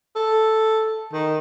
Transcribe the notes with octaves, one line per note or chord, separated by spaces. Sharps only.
A4
D#3